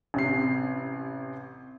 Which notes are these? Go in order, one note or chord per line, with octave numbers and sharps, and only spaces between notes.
A1 C3 C7